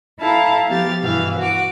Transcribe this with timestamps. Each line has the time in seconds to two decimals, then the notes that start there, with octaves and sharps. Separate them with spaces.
0.19 E4 A4 F5 A5 A#5
0.68 F3 B3 G4 F5 A6
1.03 G2 B2 E3 F5
1.38 F#4 D6